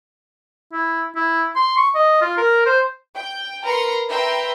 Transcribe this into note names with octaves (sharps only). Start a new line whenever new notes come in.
E4
E4
C6
C#6
D#5
F4
A#4
C5
G5
A#4 B4 A#5 C6 C#7
B4 E5 G5 A#5 C6